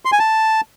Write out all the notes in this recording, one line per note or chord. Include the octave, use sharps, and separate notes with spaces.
C6
G#5
A5